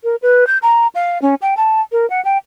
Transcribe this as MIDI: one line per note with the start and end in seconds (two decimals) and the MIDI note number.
0.04 0.16 70
0.22 0.47 71
0.47 0.58 91
0.62 0.87 82
0.95 1.21 77
1.22 1.35 61
1.42 1.57 79
1.57 1.81 81
1.92 2.08 70
2.10 2.23 78
2.25 2.38 79